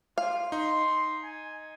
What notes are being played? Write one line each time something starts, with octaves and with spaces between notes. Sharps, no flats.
F4 F5
D#4 C6
G#5